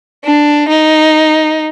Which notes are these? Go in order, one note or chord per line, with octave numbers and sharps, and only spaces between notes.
D4
D#4